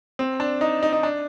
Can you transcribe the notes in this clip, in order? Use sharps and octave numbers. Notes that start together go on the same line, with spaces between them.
C4
D4
D#4
D#4
D#4
D4